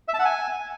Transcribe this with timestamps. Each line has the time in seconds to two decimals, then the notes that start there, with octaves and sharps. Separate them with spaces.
0.08 E5
0.14 A5
0.19 F#5
0.25 G#5